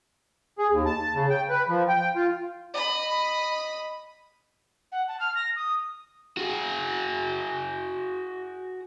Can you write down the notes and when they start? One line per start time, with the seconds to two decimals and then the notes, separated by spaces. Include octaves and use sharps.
0.58 G#4
0.71 D#2
0.86 A5
1.15 C#3
1.30 G5
1.49 B4
1.69 F3
1.88 G5
2.16 F4
2.74 D#5 B5
4.91 F#5
5.07 A5
5.19 F6
5.35 A#6
5.56 D#6
6.37 F#4 G#4